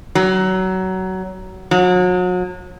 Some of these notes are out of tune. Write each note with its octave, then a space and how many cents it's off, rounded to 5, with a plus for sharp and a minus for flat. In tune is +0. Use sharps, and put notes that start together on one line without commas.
F#3 +20
F#3 -35